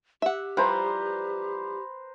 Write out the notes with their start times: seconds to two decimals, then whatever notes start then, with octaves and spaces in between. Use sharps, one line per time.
0.22 G4 E5 F#5
0.57 E3 F3 G3 B4 C5 A#5